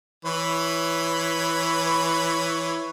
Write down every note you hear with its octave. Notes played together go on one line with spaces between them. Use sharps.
E3 B4 C#5